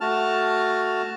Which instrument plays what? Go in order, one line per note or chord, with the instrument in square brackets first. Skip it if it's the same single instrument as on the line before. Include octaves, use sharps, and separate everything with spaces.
[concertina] A3 F#4 A5 F6